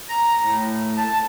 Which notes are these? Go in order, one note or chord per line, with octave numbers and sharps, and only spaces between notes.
A#5
A2
A5